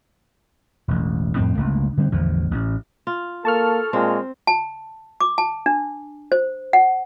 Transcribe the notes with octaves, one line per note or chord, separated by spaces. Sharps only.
E1 A1
F2 A2 C4
G1 C#2 A3 A#3
D3 G3 A#3 C4
A1 E2 D3 F3
A1
F4
A#3 A4 A5 C#6 F6
A#2 G#3 C4
A5
D6
A5
D4
C5
F#5